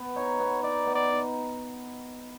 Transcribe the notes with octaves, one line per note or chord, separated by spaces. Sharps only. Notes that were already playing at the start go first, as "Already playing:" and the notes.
Already playing: B3
D#4 C#5
B3
D#4 D5
B3
D5
D#4